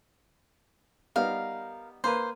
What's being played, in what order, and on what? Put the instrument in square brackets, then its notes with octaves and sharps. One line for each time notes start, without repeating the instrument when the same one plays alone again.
[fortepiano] G3 B3 D#4 [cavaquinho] A#4 F5
[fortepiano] A#3 B4 [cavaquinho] C5